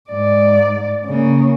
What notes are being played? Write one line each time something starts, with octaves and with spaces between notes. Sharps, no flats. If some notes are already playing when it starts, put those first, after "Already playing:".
G#2 D5
C#3 A#3